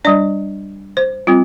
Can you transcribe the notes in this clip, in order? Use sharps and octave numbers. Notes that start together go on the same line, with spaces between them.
G3 D4 D5
C5
G3 C4 F4